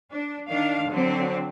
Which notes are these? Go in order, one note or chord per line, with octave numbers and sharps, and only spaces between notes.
D4
D#3 D4 F5
D3 F#3 C4